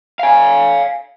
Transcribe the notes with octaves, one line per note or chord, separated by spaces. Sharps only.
F5 G#5